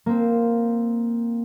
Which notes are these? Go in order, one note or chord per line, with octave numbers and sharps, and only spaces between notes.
A#3 C4